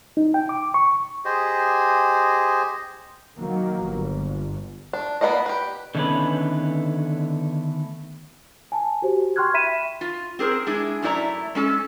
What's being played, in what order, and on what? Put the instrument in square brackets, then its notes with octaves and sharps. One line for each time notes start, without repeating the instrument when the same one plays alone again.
[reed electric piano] D#4
G5
D6
C#6
[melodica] G4 G#4 C5 D#5
[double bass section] D#3 F#3 A#3
G1
[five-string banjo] D4
A#3 B3 D#4 D5 D#5
G4 B4
[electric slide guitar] D3 D#3 A3 B3 C#4 B4
[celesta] G#5 A5
F#4 G4 C5
G5 C6 C#6 F6 F#6 G#6
E5 B5 B6 D#7 E7
[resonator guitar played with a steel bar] F4
C4 G#4 A#4 C5
G#3 D4 E4 G#4
F#2 A3 E4 D5 A#5
G#3 C#4 A4